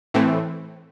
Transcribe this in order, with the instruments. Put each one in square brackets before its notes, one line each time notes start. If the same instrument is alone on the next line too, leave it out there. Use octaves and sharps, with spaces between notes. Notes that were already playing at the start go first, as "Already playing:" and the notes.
[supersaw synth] A2 E3 A3 C4